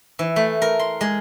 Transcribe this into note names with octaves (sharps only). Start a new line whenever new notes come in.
E3
A3
A#4
C6
G#3